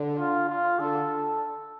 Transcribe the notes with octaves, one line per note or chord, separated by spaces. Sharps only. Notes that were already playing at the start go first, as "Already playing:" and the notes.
Already playing: D3
F4
F4
D3 A4